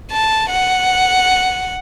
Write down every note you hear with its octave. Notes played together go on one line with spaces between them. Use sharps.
A5
F#5